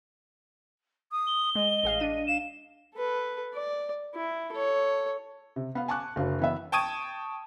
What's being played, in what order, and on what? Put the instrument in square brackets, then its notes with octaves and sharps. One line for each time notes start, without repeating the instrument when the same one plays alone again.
[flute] D#6
[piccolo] G7
[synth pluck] G#3 [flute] D#5
[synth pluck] A1 G#4 F5
D4 D#7
[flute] F5 [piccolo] E7
[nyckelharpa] A4 B4
D5
E4
A4 C#5
[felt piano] C3
B3 F5
G#5 A5 C#6 D6 F#6
F#1 F#2 D3 F5
E3 B3 E5
[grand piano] G5 A5 C#6 D#6 G#6 D#7